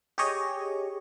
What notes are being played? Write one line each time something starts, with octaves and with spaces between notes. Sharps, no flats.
G4 G#4 C#5 D#5